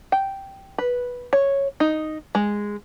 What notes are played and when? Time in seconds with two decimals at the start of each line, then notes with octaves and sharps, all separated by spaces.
0.12 G5
0.78 B4
1.33 C#5
1.80 D#4
2.35 G#3